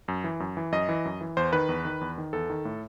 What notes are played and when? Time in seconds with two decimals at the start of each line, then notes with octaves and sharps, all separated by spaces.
0.08 F#2
0.24 E3
0.40 F#2
0.57 E3
0.72 F#2 D#5
0.89 E3
1.05 F#2
1.21 E3
1.37 E2 C5
1.53 D#3 B4
1.69 E2
1.85 D#3
2.01 E2
2.18 D#3
2.33 E2 A4
2.50 D#3
2.65 A2